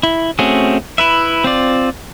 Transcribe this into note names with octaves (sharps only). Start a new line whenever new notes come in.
E4
A3 C4 C#4 F#4 G#4
E4 B4 E5
C4 F4 D5